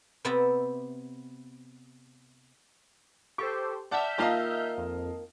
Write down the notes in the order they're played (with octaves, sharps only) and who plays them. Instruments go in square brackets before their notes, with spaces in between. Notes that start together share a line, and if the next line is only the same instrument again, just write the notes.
[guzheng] C3 B3 C4 D5 E5 A#5
[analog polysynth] G4 A4 C5 [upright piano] C#6
[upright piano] D5 F#5 A5 [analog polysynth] E5 F6 G6
[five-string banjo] D#3 A#3 F4 [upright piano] D#5 F5 A5
[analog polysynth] F2